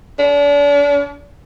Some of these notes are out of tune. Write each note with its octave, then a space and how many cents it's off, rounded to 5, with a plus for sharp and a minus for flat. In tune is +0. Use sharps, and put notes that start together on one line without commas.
D4 -40